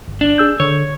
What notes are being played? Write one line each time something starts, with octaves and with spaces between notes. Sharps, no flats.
G1
D4
G#4 E6 G6
D3 C#5